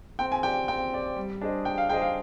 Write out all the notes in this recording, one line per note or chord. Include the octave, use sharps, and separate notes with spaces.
C4 G5
G#5
G4 D5 G5
C4 G5
G4 D5
G3
D4 G#4 C5 D#5
G3 G5
F5
D4 G#4 C5 D#5 G5
F5